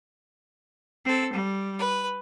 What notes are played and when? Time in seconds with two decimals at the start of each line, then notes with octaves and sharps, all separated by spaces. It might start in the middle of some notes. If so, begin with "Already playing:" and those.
1.05 C4 A4
1.33 G3
1.78 B4